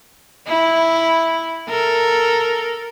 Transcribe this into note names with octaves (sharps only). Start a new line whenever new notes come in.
E4
A4 A#4